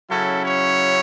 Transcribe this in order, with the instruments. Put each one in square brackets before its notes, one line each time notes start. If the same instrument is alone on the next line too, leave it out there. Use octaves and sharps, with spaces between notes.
[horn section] C#3 F#3 C#4 E4 A4
C#5